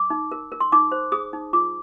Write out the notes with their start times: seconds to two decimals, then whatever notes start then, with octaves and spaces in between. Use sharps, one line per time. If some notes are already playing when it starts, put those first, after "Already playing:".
Already playing: D6
0.10 D#4
0.32 A#4
0.52 A#4
0.60 C6
0.72 D#4 D6
0.92 C5
1.12 G#4 D#6
1.33 D#4
1.53 F4 D6